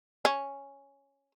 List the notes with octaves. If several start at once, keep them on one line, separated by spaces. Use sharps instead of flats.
C#4